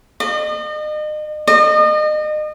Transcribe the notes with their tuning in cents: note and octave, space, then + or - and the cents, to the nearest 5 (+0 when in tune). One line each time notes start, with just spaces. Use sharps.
D#5 -40
D#5 -35